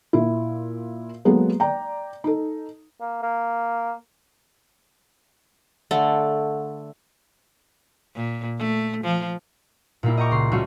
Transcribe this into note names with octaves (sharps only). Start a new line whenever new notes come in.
A#2 E4
F#3 G#3 A#3 B3 A4
D5 G5 A#5
D#4 A4
A#3
A#3
D3 A3
A#2
A3
F3
A#2 G3 A#3 E4
D#5 G5 A#5 C#6 D6
C#2 C6
G3 A3 A#3 C#4 F4 F#4